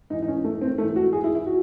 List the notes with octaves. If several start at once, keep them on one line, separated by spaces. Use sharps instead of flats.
G#2 E3 D#4
D#4
C#4
A3
C4
G#2 E3 A3
F#4
G#4
E4
E4
F#4